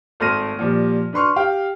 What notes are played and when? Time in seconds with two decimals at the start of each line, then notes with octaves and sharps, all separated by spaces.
0.20 G#1 A3 C6 F6 A#6 D#7
0.59 A#2 F3 G3
1.13 D4 B4 C6 C#6 F6
1.36 G4 F5 G5